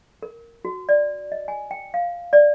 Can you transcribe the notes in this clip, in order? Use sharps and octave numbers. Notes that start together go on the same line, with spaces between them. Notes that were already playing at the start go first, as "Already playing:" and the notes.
A#4
F#4
D5
D#5
G#5
G5
F5
D5